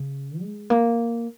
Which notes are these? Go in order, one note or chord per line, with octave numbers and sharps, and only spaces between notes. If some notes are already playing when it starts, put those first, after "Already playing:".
Already playing: C#3
G#3
A#3